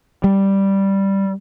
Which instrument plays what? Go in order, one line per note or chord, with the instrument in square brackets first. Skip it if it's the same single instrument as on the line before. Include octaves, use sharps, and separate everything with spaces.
[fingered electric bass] G3